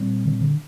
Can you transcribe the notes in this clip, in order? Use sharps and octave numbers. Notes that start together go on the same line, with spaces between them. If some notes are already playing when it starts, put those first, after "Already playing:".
Already playing: A#2 G3 C4
D3
D3